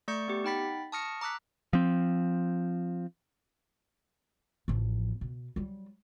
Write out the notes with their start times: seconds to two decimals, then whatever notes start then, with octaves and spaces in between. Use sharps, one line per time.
0.08 A3 D5 C#6 G6 C#7
0.28 B3 G4
0.44 D#4 F#5 G5 B5 A6 B6
0.92 A5 C#6 D#6 F6 A#6 C#7
1.21 A#5 D6 E6 F#6 B6
1.73 F3 C4
4.68 A1 F3
5.21 B2
5.56 F#3 G3